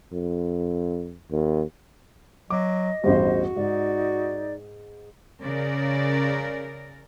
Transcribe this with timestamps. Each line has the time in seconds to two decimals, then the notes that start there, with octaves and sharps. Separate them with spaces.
0.13 F2
1.31 D#2
2.50 F#3 D#5 D6
3.04 A1 E2 G2 F#4 C5
3.56 G#2 D#4 D5
5.40 C#3 A#4 D5